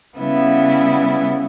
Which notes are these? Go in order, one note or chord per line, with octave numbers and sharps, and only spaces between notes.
C#3 G3 B3 E4